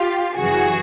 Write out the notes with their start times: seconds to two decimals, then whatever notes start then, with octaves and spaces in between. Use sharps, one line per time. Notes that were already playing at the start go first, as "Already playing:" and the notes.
Already playing: F4 G4
0.36 F#2 C#3 E3 G3 F#4 G#4